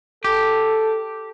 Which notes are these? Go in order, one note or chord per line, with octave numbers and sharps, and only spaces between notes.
G4 A4